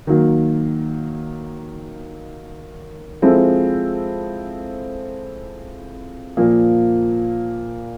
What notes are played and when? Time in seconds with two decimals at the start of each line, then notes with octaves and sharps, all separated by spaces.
0.07 D#3 F#3 A#3
3.22 F3 G#3 C4 E4 A4
6.37 A#2 F3 A#3